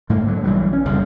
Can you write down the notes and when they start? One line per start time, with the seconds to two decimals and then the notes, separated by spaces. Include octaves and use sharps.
0.09 G#2 A3 A#3
0.26 D3 F#3
0.43 B1 E3 F#3 G3
0.73 C#4
0.85 F#1 C2 F2 C#3